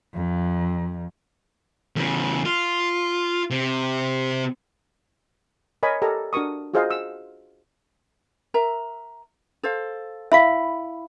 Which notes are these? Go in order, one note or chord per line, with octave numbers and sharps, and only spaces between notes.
F2
E2 C#3
F4
C3
A#4 C#5 D#5 G#5 B5
G4 A4 A#4 D5 D#5 A#5
D4 F#4 A#4 C#6 D#6
F4 F#4 G#4 C5 D#5 F5
E6
A#4 E5 A#5
A4 C5 F5
E4 E5 F5 B5